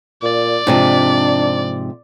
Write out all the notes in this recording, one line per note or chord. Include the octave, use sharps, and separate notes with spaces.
A#2 D5
G#2 C3 F3 D4